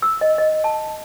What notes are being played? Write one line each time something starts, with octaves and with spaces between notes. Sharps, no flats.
E6
D#5
D#5
A5